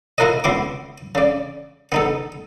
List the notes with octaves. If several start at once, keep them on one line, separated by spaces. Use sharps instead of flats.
E4 F4 A#4 B4 D#5
C#2 B3 E4 C6 D6
C#3 D5
B3 D#4 A4